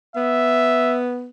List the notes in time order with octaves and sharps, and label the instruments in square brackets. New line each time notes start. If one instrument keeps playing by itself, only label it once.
[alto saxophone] B3 [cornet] E5